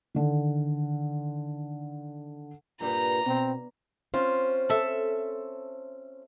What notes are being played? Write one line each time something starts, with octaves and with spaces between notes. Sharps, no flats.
D3 D#3
G2 A#2 G3 B4 A#5
B2 C4
C4 C#4 F4 C5
A4 E5